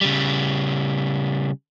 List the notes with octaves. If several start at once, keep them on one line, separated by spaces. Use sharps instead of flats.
C#3 G3